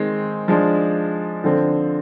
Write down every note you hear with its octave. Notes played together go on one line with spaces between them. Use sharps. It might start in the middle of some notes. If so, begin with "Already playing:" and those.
Already playing: D#3 G#3 C4
F3 G#3 D4
D3 F3 C4